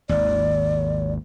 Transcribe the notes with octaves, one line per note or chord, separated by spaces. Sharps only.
G#1 D#2 D5